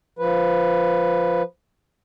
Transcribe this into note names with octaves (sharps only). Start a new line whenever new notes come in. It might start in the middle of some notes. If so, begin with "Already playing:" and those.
F3 B4